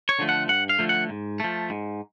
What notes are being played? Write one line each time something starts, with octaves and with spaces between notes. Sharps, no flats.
C#5
D3 F3 A3
F#5
G2 F#5
F5
D3 F3 A3
F#5
G#2
F3 A3
G#2